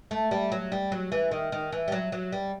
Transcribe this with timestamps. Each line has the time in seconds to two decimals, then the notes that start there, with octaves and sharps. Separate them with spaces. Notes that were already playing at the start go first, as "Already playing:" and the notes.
0.11 A3
0.31 G3
0.52 F#3
0.72 G3
0.92 F#3
1.12 E3
1.31 D#3
1.52 D#3
1.72 E3
1.88 G3
1.92 F#3
2.12 F#3
2.32 G3